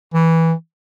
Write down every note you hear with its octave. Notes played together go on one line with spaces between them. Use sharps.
E3